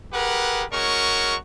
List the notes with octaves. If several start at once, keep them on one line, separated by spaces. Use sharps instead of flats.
G4 G#4 A#4 B4 F#5
G#3 C#4 F#4 A#4 C#6